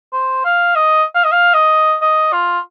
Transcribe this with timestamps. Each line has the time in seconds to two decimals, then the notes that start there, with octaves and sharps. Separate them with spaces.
0.13 C5
0.45 F5
0.75 D#5
1.15 F5
1.24 D#5
1.32 F5
1.54 D#5
2.02 D#5
2.32 F4